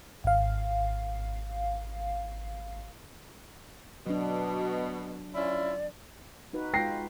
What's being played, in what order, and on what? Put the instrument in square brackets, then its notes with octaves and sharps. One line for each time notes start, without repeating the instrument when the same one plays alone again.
[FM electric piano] G#1 F5
[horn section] B2 [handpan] F#3 D4
[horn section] C#4 E4 F4 [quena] D5
[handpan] D#4 F#4 B4
[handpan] G#3 F4 [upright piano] G5 A#6 C7